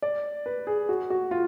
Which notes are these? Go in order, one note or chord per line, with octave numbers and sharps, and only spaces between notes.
D5
B4
G#4
F#4
F#4
F4